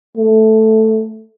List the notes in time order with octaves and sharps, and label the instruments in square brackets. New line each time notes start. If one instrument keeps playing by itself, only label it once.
[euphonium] A3